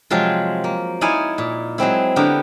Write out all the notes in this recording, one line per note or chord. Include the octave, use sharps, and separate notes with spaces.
C3 F3 F#3 G#3 C4 F4
A#3
D#4 E4 C#5 D5 F5 G#5
A#2
F#3 G#3 C4 E4
D3 B3 G4 A#4